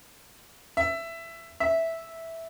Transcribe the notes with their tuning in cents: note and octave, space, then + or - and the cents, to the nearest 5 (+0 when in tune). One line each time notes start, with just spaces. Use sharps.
E5 +15
E5 -5